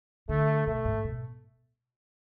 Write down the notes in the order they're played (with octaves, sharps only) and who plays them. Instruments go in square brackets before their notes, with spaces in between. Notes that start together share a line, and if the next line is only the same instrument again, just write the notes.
[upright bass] D3 [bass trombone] A3
[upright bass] B2 [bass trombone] A3
[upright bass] G#2
B2